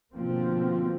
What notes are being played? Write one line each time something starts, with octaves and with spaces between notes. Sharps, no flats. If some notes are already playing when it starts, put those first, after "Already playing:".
B2 D3 F3 A#3 C4